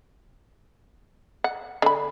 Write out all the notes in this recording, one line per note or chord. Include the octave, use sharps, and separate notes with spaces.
F#5
D3 B5